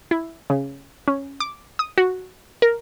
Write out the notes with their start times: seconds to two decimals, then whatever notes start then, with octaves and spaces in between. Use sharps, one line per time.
0.11 E4
0.50 C#3
1.08 C#4
1.40 D6
1.79 D#6
1.98 F#4
2.62 A#4